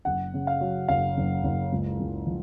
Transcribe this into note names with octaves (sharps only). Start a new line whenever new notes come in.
F#1 F#5
C#3
F5
F#3
F#1 F5
F#1
F#1
C#2
C#2
F3